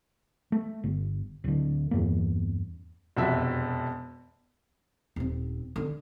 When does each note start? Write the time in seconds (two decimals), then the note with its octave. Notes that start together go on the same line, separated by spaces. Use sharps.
0.52 A3
0.84 G1
1.44 D1 D3
1.91 E2 G2 A#3
3.16 E1 F2 C3 F#4 E5
5.16 D#1 C4
5.76 D3 C#4